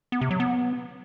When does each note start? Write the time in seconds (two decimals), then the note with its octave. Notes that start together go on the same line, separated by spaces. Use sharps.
0.12 B3
0.21 C3
0.31 F#3
0.40 B3